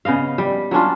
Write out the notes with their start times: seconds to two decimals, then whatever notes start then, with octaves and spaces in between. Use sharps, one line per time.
0.05 C#3 B3 D#5 F5
0.38 G3
0.71 F#3 C#4 D4 F4